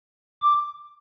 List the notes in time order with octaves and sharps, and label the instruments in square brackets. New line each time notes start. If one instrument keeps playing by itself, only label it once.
[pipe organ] D6